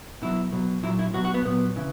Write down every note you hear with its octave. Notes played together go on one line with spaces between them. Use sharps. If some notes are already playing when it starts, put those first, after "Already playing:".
B2 F#3 E4
B2 F#3
A#2 F#3 E4
E4
B2 F#3 F#4
F#4
B3
A#2 F#3 B3
C#3 E3